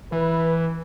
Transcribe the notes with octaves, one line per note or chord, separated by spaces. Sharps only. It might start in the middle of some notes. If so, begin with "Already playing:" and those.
E3 B4